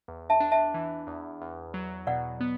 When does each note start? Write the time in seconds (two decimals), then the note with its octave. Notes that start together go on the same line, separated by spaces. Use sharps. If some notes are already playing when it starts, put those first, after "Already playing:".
0.08 E2
0.30 E5 A5
0.40 D4
0.52 E5 A5
0.74 E3
1.07 E2
1.41 E2
1.74 F#3
2.07 B2 D5 F#5
2.40 B3